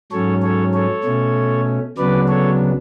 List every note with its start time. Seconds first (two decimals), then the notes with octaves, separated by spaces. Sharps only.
0.12 G#2 F#3 C#4 A4 C#5
0.42 A4 C#5
0.73 A4 C#5
1.04 B2 A3 C#4
1.98 D2 C#3 F#3 B3 D4 B4 D5
2.28 A4 C#5